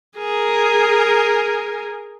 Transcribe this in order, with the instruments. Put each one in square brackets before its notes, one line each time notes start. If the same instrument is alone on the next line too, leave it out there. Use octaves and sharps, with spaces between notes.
[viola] G#4 A#4